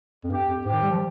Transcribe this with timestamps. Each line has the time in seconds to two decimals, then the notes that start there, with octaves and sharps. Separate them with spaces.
0.24 F2
0.30 G2 G4
0.48 F2
0.65 G#2 G4
0.73 D#3
0.83 G3
0.91 F3